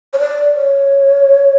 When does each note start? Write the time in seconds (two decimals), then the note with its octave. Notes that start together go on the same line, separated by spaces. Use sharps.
0.13 C#5
0.19 D5
0.54 C#5